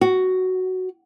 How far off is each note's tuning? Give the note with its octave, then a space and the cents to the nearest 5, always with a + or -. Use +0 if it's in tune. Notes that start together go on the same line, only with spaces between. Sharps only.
F#4 +5